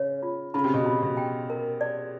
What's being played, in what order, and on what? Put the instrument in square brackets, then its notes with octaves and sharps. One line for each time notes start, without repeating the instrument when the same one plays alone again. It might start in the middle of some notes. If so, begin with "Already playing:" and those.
Already playing: [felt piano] C#3 [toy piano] C#5
[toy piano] F4
[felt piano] C#3 [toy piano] B5
[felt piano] C3
B2
[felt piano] C3 [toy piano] B5
[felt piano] B2
[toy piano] G5
A#4
D5